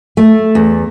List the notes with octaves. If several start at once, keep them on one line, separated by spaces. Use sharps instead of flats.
A3
E2